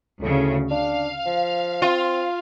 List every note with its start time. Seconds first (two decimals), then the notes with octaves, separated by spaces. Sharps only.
0.22 D2 A2 C#3
0.71 D4 F5
1.26 F3
1.82 C4 F4